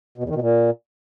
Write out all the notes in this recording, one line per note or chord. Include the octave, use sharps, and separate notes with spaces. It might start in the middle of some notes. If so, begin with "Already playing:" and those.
B2
E2
D#3
B2
A#2